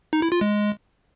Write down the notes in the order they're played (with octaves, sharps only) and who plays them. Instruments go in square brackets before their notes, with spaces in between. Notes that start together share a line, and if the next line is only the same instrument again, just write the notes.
[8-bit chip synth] D#4
E4
F4
G#3